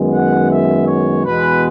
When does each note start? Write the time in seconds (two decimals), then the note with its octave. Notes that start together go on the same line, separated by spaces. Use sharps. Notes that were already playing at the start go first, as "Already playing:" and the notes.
Already playing: F#2 D#3 G#3 B3
0.13 F#5
0.51 E5
0.88 C#5
1.26 E2 B2 G#3 B4